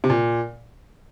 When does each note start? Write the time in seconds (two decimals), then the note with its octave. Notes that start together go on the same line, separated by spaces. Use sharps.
0.04 C3
0.10 A#2